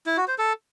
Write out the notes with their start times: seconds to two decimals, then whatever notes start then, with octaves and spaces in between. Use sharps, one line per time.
0.07 E4
0.17 F#4
0.28 C5
0.38 A4